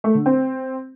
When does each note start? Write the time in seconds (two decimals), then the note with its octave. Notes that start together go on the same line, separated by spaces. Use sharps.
0.04 A3
0.15 D3
0.26 C4